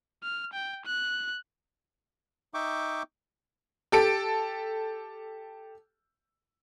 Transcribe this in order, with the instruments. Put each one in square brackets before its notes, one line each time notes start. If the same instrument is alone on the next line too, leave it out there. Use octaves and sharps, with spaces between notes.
[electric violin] F6
G5
F#6
[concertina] D#4 E5 G5 C#6 D6
[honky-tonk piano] G4 A4 D7